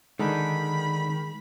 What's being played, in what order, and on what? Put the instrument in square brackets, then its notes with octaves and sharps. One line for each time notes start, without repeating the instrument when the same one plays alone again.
[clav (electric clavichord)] D3 D4 D#4 [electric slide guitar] D#3 [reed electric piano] G#3 G#4 [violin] B5